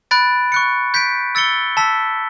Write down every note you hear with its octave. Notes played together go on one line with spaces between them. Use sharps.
B5 F#6 A6 D7
C#6 F#6 C#7
G6 B6 D7
E6 A6 C#7 G7
A5 E6 B6